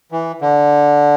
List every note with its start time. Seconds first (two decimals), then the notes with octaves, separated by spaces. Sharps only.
0.12 E3
0.41 D3